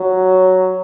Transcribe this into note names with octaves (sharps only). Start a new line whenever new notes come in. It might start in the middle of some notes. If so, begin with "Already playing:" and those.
Already playing: F#3